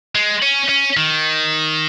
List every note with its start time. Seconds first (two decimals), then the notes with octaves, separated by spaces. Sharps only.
0.15 G#3
0.43 C#4
0.69 C#4
0.97 D#3